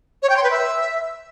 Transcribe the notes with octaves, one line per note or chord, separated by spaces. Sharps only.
C#5
G5
C6
B4
E5